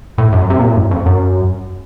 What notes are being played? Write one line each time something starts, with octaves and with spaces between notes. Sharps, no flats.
A2
F#2
C3
A#2
A2
F#2
F2
F#2